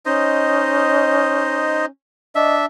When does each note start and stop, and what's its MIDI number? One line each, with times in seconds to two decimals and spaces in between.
0.06 1.90 61
0.06 1.86 63
0.06 1.86 72
0.06 1.86 75
2.35 2.66 62
2.35 2.56 75
2.35 2.66 76